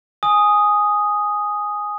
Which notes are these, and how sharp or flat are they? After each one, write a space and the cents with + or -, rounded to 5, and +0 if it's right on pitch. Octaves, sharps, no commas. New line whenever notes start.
G#5 +0 D#6 +0